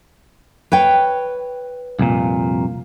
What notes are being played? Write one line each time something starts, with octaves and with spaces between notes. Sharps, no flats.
B4 C#5 G5
C2 F2 A#2